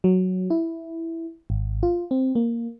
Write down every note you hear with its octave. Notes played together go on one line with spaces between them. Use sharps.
F#3
E4
G#1
F4
C4
A#3